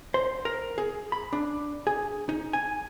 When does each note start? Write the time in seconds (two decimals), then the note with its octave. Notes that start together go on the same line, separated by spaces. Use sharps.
0.14 C5
0.45 A#4
0.78 G#4
1.12 B5
1.33 D4
1.87 G#4
2.29 D#4
2.53 G#5